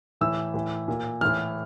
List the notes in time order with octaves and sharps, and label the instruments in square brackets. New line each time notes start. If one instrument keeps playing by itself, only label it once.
[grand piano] A2 E3 E6
A2 E3
A#2
A2 E3 F6